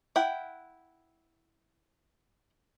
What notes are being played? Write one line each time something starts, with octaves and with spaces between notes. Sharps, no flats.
E4 F#5 G5